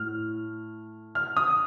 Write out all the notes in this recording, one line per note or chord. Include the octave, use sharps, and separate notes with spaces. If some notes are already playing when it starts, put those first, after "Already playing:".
Already playing: A2 F6
F6
D#6